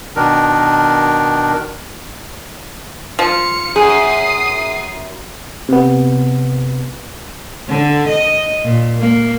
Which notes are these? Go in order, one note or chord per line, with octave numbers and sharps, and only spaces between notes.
B2 D#3 D4 A#4
F3 F5 C#7
F#2 G#4 D#6 C7
C3 B3
D3
D#5
A#2
A#3